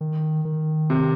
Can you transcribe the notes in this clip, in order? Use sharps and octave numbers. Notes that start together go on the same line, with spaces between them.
D#3
D#3
C3